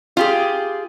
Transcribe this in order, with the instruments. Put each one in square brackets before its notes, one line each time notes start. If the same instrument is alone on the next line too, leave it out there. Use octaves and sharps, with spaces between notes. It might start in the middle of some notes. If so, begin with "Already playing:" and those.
[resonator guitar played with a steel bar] F4 G4 G#4